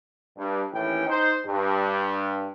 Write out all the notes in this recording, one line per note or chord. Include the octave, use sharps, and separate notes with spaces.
G2
D#2 A2 E3 C#4 G5
D#4 C5
G2